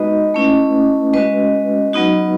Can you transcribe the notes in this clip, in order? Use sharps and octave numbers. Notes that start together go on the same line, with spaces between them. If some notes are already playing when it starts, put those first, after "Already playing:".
Already playing: G#3 B3 D#4 F#4 B4 D#5
A3 C#4 E4
G#3 C#4 F#4 B4 D#5
F#3 B3 D#4 F#4